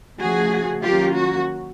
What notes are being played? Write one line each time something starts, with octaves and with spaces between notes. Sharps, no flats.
C#3 F3 A3 F#4 G#4
D#3 F#3 A#3 C#4 F4 G4
F#4